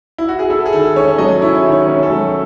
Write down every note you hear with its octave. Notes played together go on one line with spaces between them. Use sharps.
E4
F#4
G#4
E4 A4
G#4
D#3 A4
C#4 C#5
F#3 D#5
E4 C#5
D#3
C#5
C#4
A4
F#3